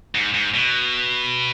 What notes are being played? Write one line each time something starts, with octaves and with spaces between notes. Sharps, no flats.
G#2
G#2
B2